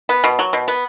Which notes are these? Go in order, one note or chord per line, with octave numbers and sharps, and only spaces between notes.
B3
B2
F#3
B2
B3